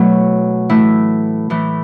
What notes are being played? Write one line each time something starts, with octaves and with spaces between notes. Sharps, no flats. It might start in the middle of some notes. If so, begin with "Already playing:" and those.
Already playing: B2 F#3 A3 E4
A2 E3 A3 E4
A2 E3 A3